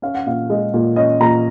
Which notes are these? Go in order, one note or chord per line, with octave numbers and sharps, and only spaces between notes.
C#4 F5
F#5
A#2 F5
G#3 D#5
A#2
C#4 D#5
A#2 A#5